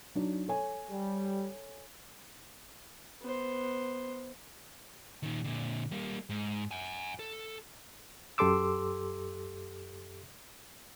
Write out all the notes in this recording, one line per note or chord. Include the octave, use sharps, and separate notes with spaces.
F#3 D4 D#4
A4 C#5 G#5
G3
B3 C5
A#2 D#3
A#2 D3
G3 A#3
G#2
F#5 G#5
A4
F#2 G4 A4 C6 D6 E6